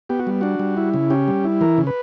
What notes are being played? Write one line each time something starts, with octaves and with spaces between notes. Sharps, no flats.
B3 G4
F#4
G3
D4 F#4
G3
E4
C#3
C#4 G4
G3
E4
E3 A#4
C#3
B4